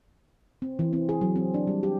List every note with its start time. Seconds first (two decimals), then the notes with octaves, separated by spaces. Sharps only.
0.62 C4
0.79 E3
0.93 C4
1.09 G#4
1.21 F#3
1.36 C4
1.54 D4
1.67 G3
1.83 G4